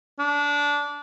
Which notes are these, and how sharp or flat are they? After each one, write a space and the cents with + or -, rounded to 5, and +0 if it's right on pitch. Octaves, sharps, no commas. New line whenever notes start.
D4 -20